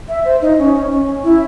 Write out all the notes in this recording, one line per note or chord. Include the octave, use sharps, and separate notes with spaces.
E5
C5
D#4
C#4
C#4
E4